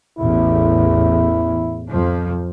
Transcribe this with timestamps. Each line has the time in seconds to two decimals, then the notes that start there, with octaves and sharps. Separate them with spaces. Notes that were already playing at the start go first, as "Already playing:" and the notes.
0.19 A1 E2 E4
1.88 F2 F3